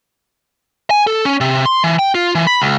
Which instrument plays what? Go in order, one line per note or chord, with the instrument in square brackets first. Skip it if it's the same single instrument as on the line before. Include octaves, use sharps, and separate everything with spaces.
[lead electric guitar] G#5
A4
C#4
C3
C6
E3
G5
F4
E3
B5
C#2